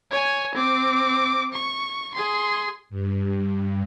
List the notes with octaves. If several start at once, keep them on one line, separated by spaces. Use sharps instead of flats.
C#5 G#5
C4 D6
C#6
G#4 C6
G2